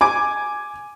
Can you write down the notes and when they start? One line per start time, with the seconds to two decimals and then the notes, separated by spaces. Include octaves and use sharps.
0.01 G#5 D6